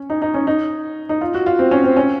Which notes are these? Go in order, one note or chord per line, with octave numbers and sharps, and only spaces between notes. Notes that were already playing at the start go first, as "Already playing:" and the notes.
Already playing: C#4
D#4
D#4
C#4
D#4
D#4
F4
F#4
F4
C4
C#4
C4
C#4